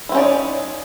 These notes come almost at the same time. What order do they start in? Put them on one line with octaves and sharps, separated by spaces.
E4 C4 C#4 D5 D#4